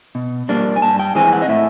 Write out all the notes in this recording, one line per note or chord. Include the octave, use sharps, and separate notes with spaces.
B2
G3 A#3 D4
G#5
G2 A5
G5
E3 G#3 C4 G#5
F#5
D#5
A2 E5